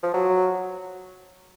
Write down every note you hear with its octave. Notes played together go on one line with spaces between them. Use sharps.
F3
F#3